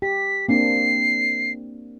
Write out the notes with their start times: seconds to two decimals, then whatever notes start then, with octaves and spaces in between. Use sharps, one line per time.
0.02 G4 B6
0.48 A#3 C4 D4 C7